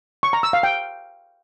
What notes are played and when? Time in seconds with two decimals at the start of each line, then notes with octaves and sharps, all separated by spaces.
0.23 C#6
0.33 A#5
0.43 E6
0.53 F5
0.63 G5